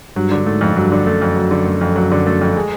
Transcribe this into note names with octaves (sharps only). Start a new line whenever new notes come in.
G2 F#3
D3
G#2 A3
F2
G2 F#3
D3
F#2 A3
F2
F#3
D3
A3
F2
F#3
D3
A3
F2
G#3